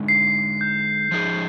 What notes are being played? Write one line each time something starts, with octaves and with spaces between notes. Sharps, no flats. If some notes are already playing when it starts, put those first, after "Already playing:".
Already playing: D3 G#3 D#4
C7
G6
F3 G#3 D#4 G#4